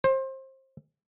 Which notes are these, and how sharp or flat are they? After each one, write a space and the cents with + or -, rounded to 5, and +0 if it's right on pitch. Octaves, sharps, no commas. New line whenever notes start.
C5 +25